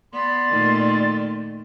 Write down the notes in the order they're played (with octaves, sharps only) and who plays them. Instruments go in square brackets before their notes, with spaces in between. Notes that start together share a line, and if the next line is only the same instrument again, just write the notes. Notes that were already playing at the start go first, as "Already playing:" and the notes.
[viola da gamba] B3 [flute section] D5 C6
[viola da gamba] A#2 D#3 A3